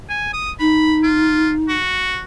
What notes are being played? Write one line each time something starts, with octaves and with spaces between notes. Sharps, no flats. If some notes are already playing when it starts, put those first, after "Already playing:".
G#5
D#6
D#4 B5
F4
F#4